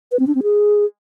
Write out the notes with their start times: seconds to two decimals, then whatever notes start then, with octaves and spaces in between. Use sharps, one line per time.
0.12 B4
0.19 C4
0.27 D4
0.35 C4
0.43 G#4